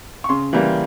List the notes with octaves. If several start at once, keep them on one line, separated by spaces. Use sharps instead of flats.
C#6
C#3 C6
E3 G3 A#3